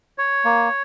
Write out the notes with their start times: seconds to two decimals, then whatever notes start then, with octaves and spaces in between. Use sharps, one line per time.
0.18 C#5
0.45 A#3